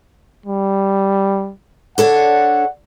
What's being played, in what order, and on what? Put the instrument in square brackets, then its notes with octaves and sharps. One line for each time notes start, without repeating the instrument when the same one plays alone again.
[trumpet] G3
[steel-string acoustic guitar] D4 A4 C#5 [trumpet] F#5